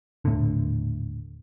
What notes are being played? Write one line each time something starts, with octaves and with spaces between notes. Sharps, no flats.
D#1 A2 D3